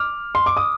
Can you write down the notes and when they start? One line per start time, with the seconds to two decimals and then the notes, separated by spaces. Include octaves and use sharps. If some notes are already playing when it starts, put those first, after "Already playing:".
Already playing: D6 F6
0.35 C6
0.46 D6
0.57 D#6